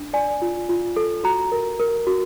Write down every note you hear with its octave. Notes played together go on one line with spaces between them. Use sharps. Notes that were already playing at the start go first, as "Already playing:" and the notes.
Already playing: D4
D5 G#5
F4
F4
A4
F#4 A#5
A#4
A#4
F#4